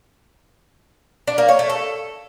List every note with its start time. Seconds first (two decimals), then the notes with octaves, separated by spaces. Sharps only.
1.27 D4
1.38 A#3
1.48 C#5
1.59 A3
1.70 A4